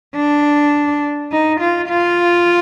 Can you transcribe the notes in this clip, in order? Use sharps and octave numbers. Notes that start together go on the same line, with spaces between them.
D4
D#4
F4
F4